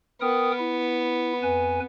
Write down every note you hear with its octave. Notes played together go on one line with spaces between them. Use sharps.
B3 A#4 G5 D#6
E4
F2 B4 G#5